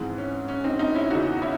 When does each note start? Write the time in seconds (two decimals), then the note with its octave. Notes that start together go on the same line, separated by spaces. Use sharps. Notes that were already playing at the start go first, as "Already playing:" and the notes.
Already playing: G#2 E3 G#3 C4
0.18 C#4
0.48 C#4
0.64 C4 D#4
0.79 C4 D#4
0.95 C#4 E4
1.10 E2 C#3 E3 D#4 F#4
1.42 C#4 E4